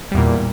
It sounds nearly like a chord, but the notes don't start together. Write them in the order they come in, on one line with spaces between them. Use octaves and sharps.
G3 E2 A#2